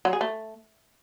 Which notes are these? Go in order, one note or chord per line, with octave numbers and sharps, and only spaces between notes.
F#3
G#4
A3